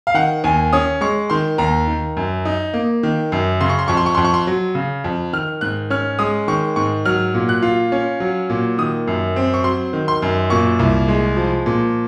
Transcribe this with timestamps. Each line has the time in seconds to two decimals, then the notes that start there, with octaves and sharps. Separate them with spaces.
0.07 F5
0.14 D#3 F#5
0.44 D#2 G#5
0.73 C#4 D#6
1.01 G#3 C#6
1.30 D#3 C6
1.58 D#2 A#5
1.88 D#3
2.17 F#2
2.45 D#4
2.74 A#3
3.03 D#3
3.32 F#2
3.61 C#3 C6
3.69 C#6
3.79 C6
3.88 F2 C#6
3.97 C6
4.06 C#6
4.15 F2 C6
4.25 C#6
4.34 C6
4.47 F#3
4.75 C#3
5.04 F2
5.33 D#3 F6
5.61 G#2 F#6
5.90 C#4 F6
6.19 G#3 D#6
6.48 D#3 C#6
6.76 G#2 C#6
7.06 F#3 F6
7.34 A#2
7.49 F#6
7.62 F4
7.92 C#4
8.20 F#3
8.50 A#2
8.78 D#3 D#6
9.07 F#2
9.36 C4
9.54 C#6
9.64 F#3 C6
9.93 D#3
10.08 C6
10.22 F#2
10.50 A#2 C#6
10.79 C2
11.08 G#3
11.37 F3
11.66 A#2